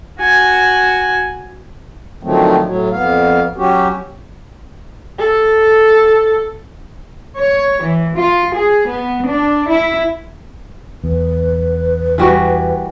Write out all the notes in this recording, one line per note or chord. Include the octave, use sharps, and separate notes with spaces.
F#4 G#5
D3 D#3 F3 F#3 A3 C4
A2 F#3
F2 B3 F5
F#3 C#4 F#4 G4
A4
C#5
E3
F4
G#4
B3
D4
E4
E2 B4
E3 G3 F#4